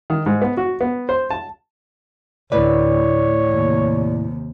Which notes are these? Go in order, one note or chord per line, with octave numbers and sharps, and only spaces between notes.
D#3
G#2
B3
F#4
B3
C5
A5
D2 A2 B4 C#5 D5
D#2 C3